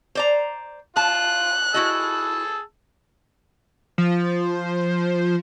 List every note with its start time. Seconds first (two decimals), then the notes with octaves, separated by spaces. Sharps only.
0.15 C5 D5 A#5
0.96 F4 A5 F#6
1.74 E4 F#4 G#4 D#5 A5 E6
3.98 F3